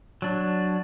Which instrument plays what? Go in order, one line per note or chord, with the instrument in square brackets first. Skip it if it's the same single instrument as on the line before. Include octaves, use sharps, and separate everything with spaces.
[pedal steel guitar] F#3 D4